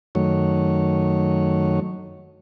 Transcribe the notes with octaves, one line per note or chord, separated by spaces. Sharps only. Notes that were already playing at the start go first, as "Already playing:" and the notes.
F#2 D#3 F#3 A3 C#5